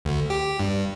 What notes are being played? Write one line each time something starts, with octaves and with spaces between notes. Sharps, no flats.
D2
G4
G2